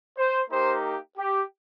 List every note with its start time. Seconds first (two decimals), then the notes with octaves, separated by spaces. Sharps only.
0.18 C5
0.51 A#3 D#4 G4 C5
1.18 G4